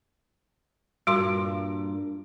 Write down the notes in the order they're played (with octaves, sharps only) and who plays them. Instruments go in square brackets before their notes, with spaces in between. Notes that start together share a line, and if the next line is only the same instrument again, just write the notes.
[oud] G2 A#2 [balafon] G3 F#4 C6